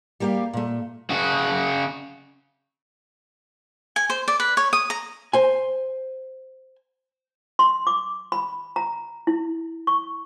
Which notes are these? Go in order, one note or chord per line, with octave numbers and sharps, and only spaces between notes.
G3 A#3 G4 F5
A#2 A3
C#3 F#4
G#5
C5
D5
B4
C#5
D#6
A#5
C5 G#5
C6
D6
B5
A#5
E4
C#6